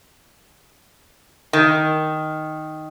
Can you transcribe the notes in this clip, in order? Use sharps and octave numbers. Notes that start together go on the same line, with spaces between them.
D#3